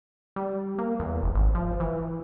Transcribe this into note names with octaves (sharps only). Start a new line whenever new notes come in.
G3
A#3
E2
F1
G#1
F3
E3